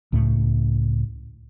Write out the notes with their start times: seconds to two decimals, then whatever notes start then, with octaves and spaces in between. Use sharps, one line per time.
0.12 C#2 A2 A3